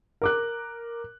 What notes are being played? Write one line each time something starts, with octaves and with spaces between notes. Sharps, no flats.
A#4 D6 F#6